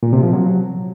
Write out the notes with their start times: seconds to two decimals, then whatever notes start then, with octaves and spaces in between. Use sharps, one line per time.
0.03 A#2
0.13 C3
0.23 F3
0.33 F#3